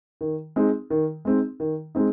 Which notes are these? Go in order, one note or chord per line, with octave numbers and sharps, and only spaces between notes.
D#3
G#3 C4 D#4
D#3
G#3 C4 D#4
D#3
G#3 C4 D#4